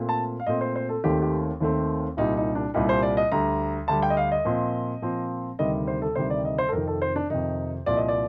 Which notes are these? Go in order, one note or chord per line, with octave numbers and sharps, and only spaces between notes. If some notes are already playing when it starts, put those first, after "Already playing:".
Already playing: A#2 A3 C4
A5
F5
A#2 A3 C4 D#5
C5
C5
A4
D#2 D#3 A3 C4 G4
G4
D#2 D#3 A3 C4
C2 A#2 G3 D#4
D#4
D4
C2 A#2 G3 D#4
C5
D5
D#5
D2 D3 G3 A#5
D2 D3 G3 A5
G5
D#5
F5
D#5
A#2 F3 C4
A#2 F3 C4
D2 C3 D#3 G3 D#5
C5
A4
D2 C3 D#3 G3 C5
D5
D#5
C5
A4
F2 C3 D#3 A#4
A4
C5
D4
F2 C3 D#3 D#4
C2 A#2 F3 D5
D#5
D5